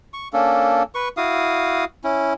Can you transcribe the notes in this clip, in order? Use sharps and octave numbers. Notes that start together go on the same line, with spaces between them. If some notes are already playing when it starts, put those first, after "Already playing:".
C#6
A#3 C#4 D4 A4
B4 C#6
E4 F#4 F5 D#6
C#4 E4